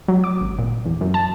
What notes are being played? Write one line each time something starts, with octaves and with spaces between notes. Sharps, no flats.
F#3
D6
G#1
A#2
E2
F#2
A5